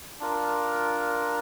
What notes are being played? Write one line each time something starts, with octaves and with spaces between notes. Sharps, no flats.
D4 F4 A#4